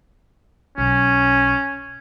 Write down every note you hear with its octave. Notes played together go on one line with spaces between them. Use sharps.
B1 C#4